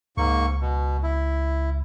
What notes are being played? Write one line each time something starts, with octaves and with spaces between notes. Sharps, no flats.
C#2 G#2 A#3 C#6
B2
E4